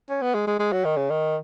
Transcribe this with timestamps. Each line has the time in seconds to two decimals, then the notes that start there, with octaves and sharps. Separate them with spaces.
0.10 C#4
0.22 B3
0.34 G#3
0.47 G#3
0.59 G#3
0.72 F#3
0.85 D#3
0.97 C#3
1.10 D#3